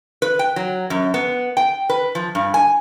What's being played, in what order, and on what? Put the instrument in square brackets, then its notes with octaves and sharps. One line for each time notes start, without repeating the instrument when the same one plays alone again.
[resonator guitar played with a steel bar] B4
G5
F#3
F#2
B3
G5
B4
F3
G2
G#5